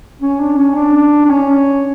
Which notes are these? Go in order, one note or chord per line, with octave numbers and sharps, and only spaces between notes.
C#4
D4
C#4
D4
D4
C#4